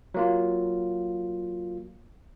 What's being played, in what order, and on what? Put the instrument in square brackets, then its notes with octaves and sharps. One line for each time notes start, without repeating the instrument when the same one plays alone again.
[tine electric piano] F#3 A#3 F4